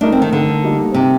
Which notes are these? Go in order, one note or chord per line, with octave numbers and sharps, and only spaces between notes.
A3 D4 D#4 A#4
C4
D#3
D3
G3 A#3 D#4
C3